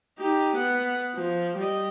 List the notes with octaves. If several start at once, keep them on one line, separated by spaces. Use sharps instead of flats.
D#4 G4
B3 F#5
F3
G3 D#5